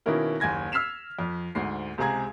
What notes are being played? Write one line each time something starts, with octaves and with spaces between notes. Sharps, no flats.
B2 D#3 A#3 C#4 E4 A#4
F#1 D#2 G#5 G#6 A#6
E6 F6 B6 C7 E7 F7
F2
D2 G#2 C7
C#2 C3 G#3 G#4 A#5 G#6